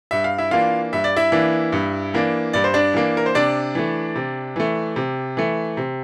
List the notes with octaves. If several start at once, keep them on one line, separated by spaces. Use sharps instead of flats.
G2 E5
F5
E4 E5
E3 A#3 D4 F4 F5
G2 E5
D5
E4 E5
E3 A#3 D4
G2
E3 A#3 D4
G2 D5
C5
D4 D5
E3 A#3 D4
A#4
C5
C3 D4 D5
E3 A3
C3
E3 A3
C3
E3 A3
C3